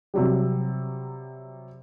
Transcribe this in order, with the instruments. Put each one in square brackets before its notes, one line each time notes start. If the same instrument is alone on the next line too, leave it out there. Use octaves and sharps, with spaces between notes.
[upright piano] C3 F#3 G3